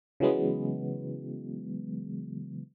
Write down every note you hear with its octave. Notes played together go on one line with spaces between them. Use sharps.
C#3 E3 F#3 G#3 B3